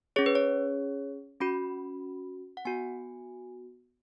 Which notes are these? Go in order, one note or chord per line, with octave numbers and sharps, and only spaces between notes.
C#4 G#4 C#5
B4
C#5
C#4 F#4 B5
F#5
B3 F#4 G#5